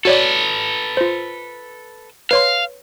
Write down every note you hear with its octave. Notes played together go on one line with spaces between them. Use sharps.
F#4 A4 B4 C#5 D5
F4 C5
B4 C#5 F5 C6